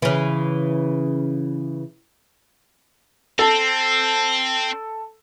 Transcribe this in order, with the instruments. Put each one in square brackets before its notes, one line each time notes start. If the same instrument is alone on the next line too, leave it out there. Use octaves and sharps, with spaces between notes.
[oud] C#3 E3
[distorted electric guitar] C4 [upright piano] A4